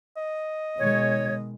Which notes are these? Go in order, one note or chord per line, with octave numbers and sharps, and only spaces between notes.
D#5
B2 D#3 G#3 C#5